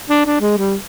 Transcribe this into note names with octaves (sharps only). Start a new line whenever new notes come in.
D4
D4
G#3
G3